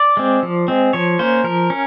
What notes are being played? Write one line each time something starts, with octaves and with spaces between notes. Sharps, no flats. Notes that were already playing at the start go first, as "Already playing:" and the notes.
Already playing: D5
G#3 C4
F3
G#3 C4
F3 C#5
A#3 C#4 C5
F3 A#4
C#4